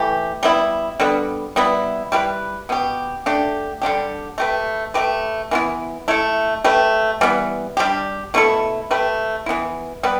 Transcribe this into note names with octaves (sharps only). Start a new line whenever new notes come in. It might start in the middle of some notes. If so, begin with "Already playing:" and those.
Already playing: E3 A3 G4
G3 B3 E4
D3 G3 B3
G3 B3 E4
G3 E4 G4 B4
B2 B3 G4
D3 A3 D4 G4
D3 G3 D4 G4
A3 G4 B4
A3 G4 B4
E3 B3 E4
A3 E4 A4
A3 G4 B4
E3 G3 B3
G3 D4 G4
B2 A3 E4 A4
A3 G4 B4
E3 B3 E4
G3 B3 G4 B4